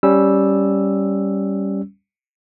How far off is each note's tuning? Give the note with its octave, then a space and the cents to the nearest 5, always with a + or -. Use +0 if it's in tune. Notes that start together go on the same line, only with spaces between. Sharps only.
G3 +0 C#4 +5 E6 +0